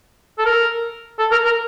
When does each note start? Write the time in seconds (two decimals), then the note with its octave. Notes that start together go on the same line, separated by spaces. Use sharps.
0.38 A4
0.45 A#4
1.19 A4
1.31 A#4
1.44 A#4